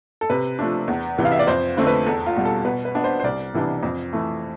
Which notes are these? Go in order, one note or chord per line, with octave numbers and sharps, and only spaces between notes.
A4
C3 B4
F3 A3 D4
E2
C3 E3 B3
F5
E5
D5
F2 C5
D3 A3 C4
B4
E2 A4
F4
B2 G3
A4
B2 B4
B4
B3 D4
C5
C5
C2 D5
C3 E3 B3 D4
F2
E3 A3